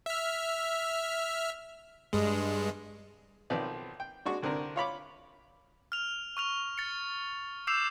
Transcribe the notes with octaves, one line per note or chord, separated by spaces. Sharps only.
E5 F6
G2 G#3
B1 D#3 F3 C4 B4 D5
G5
G#3 D4 F#4 C#6
C2 D3 C4 A#4
F4 C#5 B5 D6
F6 F7
C#6 F6 F7
A6 C#7
D6 E6 G6 C7 E7 F7